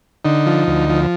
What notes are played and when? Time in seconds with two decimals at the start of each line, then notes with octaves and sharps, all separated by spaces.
0.25 D3 D#4
0.46 F3
0.68 D2
0.89 F3